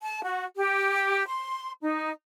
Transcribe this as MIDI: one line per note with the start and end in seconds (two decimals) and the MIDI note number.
0.03 0.23 81
0.23 0.44 66
0.56 1.26 67
1.27 1.72 84
1.82 2.11 63